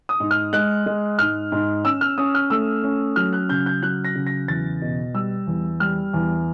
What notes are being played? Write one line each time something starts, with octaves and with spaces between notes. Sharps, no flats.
D#6
G#2
F6
G#3 F#6
G#3
G#2 F6
G#2
C#4 E6
F6
C#4 D#6
F6
A3 E6
C#4
F#3 F6
F#6
C#3 G6
G6
F#3 F#6
A#6
C#3
A#6
E2 A6
B2
G3 E6
E2
G3 F6
E2